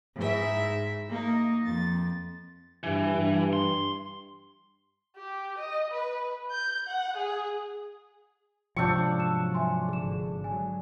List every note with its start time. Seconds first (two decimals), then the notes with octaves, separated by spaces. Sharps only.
0.16 G#2 E4 E5
1.08 A#3 D#4
1.63 F2 A6
2.83 G2 E3
3.15 G2
3.53 C6
5.17 G4
5.59 D#5
5.92 B4
6.51 G6
6.88 F#5
7.17 G#4
8.76 G#2 C3 F3 D4 G5 C#6 E6 G6
9.18 F#3 E6 E7
9.54 E5 G#5 C6
9.89 G#1 D3 G#4 E7
10.44 F#3 G#3 G#5